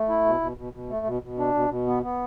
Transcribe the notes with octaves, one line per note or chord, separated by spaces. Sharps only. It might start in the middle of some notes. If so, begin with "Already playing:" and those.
Already playing: A3
E4
B2
B2
B2
B2
A3
B2
B2
D4
B2
B2
B3
B3